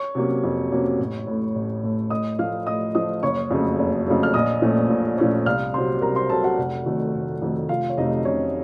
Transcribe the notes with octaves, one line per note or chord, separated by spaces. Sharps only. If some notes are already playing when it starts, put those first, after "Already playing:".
Already playing: C#5 C#6
C3 F#3 A#3 C#4
F2
C3 F#3 A#3 C#4
A1
A2 A3
A1
A2 A3
A2 D#5 D#6
F3 A3 F5 F6
A2 D#5 D#6
F3 A3 D#5 D#6
F#1 C#5 C#6
F2 C#3 F#3 A3
F#1
F2 C#3 F#3 A3
F6
A#1 D#5 D#6
A#2 F3 A3 C#4
A#1
A#2 F3 A3 C#4
C2 F5 F6
C3 F#3 C5 C6
C2 A#4 A#5
C5 C6
C3 F#3 A4 A5
F#4 F#5
F1
F2 D#3 F#3 A3
F1
F2 D#3 F#3 A3
F1 F4 F5
C#5
F2 C3 F#3 A3 D#4 D#5
F1 C#4 C#5